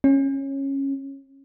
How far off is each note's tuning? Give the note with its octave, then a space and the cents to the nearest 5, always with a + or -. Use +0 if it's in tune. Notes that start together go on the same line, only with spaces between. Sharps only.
C#4 -15